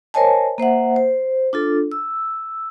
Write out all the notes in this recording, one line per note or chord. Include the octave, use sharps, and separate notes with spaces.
A#4 C5 C#5 D#5 G#5 A5
A#3 C5 E5 F#5
C5
D4 F4 A4
E6